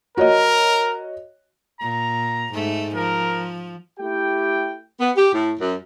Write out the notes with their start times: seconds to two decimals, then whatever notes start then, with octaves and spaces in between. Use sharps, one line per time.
0.17 F#4 A#4 C#5 D#5
1.81 A#2 A#5
2.53 G#2 A3
2.96 F3 A#4
3.99 A3 E4 G4 G5
5.00 B3
5.16 G4
5.34 A2
5.60 F#2